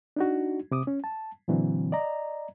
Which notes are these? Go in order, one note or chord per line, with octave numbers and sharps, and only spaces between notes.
D4 D#4 F#4
C3 D6 D#6
C#4
A5
A#2 D3 E3 F#3 C4
D5 D#5 A#5